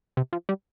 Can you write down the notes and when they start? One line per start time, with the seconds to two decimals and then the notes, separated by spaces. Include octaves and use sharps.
0.17 C3
0.33 F3
0.49 G3